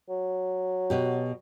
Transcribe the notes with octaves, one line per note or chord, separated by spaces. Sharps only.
F#3
B2 G4